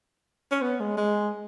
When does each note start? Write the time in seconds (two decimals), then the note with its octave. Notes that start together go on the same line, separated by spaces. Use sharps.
0.51 C#4
0.62 B3
0.80 G#3
0.97 G#3